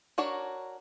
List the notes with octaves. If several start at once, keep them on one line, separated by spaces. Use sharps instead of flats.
D4 F#4 A#4 C#5